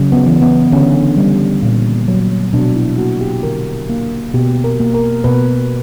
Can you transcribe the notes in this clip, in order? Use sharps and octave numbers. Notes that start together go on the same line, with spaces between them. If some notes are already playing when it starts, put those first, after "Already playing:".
Already playing: C#3 F#3
B3
E3
B3
D3 C#4
G3
A#2
F#3
B2 D4
E4
A#3 F#4
G4
D3 A#4
A#3
B2 G4
A#4
A#3
A#4
B2 B4